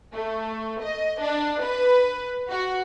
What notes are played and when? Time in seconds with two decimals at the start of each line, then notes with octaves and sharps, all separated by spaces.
0.13 A3
0.81 D#5
1.20 D4
1.63 B4
2.50 F#4